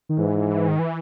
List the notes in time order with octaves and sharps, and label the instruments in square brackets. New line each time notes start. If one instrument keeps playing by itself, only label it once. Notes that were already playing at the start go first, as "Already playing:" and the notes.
[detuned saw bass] D#3
[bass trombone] G#2 [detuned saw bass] E3
[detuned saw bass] D#3
E3